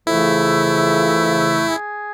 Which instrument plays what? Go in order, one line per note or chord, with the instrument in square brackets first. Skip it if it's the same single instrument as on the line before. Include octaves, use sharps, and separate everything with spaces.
[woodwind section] F2 C#3 E3 A3 [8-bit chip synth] E4
[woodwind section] G#4